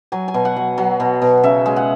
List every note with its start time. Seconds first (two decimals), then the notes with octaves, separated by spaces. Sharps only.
0.12 F#3 G#5
0.28 G#5
0.34 B2
0.45 F#5
0.56 F#3
0.78 F#3
1.00 B2
1.22 B2
1.43 C#3 E5
1.66 G#3
1.76 F#5